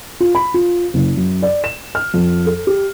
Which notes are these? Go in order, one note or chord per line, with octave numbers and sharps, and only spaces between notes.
F4
B5
F4
F#1
F#2
D5
E7
F6
F2
A4
G4